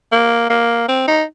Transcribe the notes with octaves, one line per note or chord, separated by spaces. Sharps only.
A#3
A#3
C4
D#4